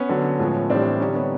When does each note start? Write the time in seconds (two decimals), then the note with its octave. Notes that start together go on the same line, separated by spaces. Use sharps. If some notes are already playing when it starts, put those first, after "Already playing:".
Already playing: B3 C#4
0.09 D3 F#3
0.39 A2 F3 G#3
0.70 A2 E3 G3 C4 D4
1.00 D3 G3 C#4 D#4
1.15 B3 C#4